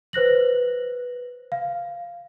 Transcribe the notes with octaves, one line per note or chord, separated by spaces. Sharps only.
B4 C5 F#6 A#6 F#7
F5